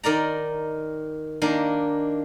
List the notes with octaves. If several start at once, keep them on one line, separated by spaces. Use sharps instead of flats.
D#3 A#4 D5 A#5
D#3 A#3 D4